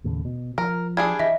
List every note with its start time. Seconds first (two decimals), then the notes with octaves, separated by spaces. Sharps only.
0.04 D#2 A2 C#3
0.25 B2
0.58 F3 A#4
0.97 G3 D4 G#4 G#6
1.19 E3 D#5 E5